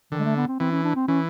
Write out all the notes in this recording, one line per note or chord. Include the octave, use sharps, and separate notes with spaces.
D3 D#3
G#3
A3
B3
C4
E3 C4
C#4
D4
C4
E3 C#4